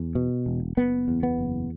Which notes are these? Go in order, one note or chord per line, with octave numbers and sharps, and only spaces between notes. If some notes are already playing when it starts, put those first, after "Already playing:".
Already playing: E2
B2
E1
F#1 B3
E2
B3
F#1